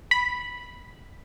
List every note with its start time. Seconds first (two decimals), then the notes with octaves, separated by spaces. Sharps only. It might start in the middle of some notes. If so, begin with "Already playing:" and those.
0.11 B5